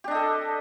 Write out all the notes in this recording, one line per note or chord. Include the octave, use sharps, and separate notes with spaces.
D4 G4 A4 D#5